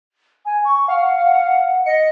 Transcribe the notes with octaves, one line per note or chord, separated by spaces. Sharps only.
G#5
C#6
F5 F#5
D#5 C#7